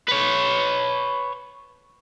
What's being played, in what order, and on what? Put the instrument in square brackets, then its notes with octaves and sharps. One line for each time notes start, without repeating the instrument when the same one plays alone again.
[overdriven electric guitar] B4 C#5